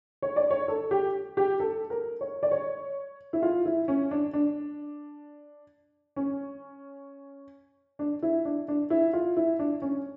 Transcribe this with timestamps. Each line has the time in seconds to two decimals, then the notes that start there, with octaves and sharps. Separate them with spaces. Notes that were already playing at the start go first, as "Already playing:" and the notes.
0.22 C#5
0.36 D5
0.50 C#5
0.68 A4
0.91 G4
1.37 G4
1.60 A4
1.90 A#4
2.21 C#5
2.43 D5
2.51 C#5
3.33 E4
3.42 F4
3.65 E4
3.88 C#4
4.11 D4
4.33 D4
6.16 C#4
7.99 D4
8.23 E4
8.45 D4
8.68 D4
8.90 E4
9.13 F4
9.37 E4
9.59 D4
9.82 C#4